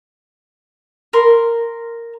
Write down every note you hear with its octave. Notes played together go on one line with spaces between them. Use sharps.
A#4 C6